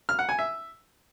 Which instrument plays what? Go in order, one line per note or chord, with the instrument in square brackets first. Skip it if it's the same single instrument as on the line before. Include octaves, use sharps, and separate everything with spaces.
[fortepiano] F6
F#5
G#5
E5